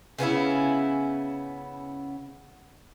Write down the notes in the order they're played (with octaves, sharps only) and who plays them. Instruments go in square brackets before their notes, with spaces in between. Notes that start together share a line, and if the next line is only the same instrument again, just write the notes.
[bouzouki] C#3 B3 C#4 E4